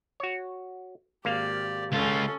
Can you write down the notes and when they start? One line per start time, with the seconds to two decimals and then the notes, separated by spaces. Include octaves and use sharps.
0.20 F#4 C#5
1.25 G#1 A#3 G4 D5 F5
1.92 C#2 C#4 F4 A4